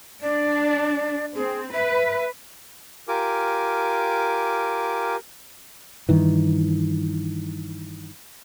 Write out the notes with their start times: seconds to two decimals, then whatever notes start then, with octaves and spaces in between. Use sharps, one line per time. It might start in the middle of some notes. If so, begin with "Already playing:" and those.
0.22 D4 D5
1.35 C4 G#4
1.74 B4 E5
3.08 F4 G4 A#4 G#5 D6
6.09 G2 D#3 E3